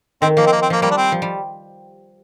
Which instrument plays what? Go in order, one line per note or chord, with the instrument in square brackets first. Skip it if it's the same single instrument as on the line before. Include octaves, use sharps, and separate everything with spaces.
[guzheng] D#3 [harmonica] C4
[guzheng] F3 [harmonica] A#3
[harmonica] C4
A#3
C4
[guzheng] F3 [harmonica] A#3
[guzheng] G3 [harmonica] A#3
[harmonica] D4
C4
[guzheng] F3
G3